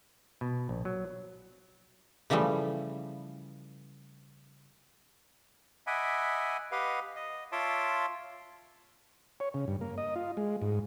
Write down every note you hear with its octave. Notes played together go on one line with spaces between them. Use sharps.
B2
A#1
F#3
C#3 E3 F3 G3 A3
D#5 E5 F#5 G#5 B5 D6
G4 B4 D#5 F5 F#5
D#5
F4 C#5 E5 A5 C6 D6
C#5
C#3
G2
A#3
D#5
F4
G#3
G#2